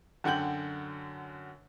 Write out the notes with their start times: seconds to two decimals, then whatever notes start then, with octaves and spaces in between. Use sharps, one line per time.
0.24 F#2 D3 F#5 G5 G6 F#7